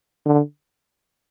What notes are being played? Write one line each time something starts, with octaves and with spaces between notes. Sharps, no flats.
D3